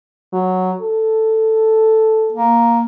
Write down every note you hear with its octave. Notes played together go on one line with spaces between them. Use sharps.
F#3
A4
A#3